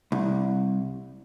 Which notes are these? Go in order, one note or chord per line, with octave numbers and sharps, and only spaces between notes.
C2